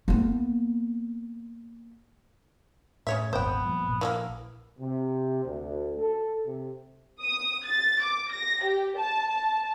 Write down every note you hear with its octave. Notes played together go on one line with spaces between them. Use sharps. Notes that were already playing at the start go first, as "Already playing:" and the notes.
A#3 B3
A2 C#3 C#5 E5
D#1 G#1 F#2 B3 C5 G5
G2 A#2 F3
A#1
E3 G3 A#3
C3
D2
A4
C3
D#6
A6
D6
A#6
G4
A5
A5